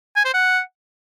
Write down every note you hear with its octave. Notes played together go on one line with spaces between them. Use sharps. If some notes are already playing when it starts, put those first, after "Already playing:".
G#5
C5
F#5